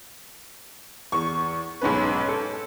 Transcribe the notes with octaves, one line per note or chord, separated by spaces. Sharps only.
E2 C#6
B1 G#2 C#4 B4
A4